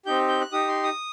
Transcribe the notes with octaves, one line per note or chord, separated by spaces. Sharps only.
C4 D#4 G4 G6
G6
F#6
D#4 G4 D#6
C6
D#6